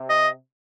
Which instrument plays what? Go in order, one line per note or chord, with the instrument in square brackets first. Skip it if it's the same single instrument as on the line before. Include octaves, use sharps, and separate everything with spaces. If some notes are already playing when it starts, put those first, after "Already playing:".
Already playing: [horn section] C3
[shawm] D#5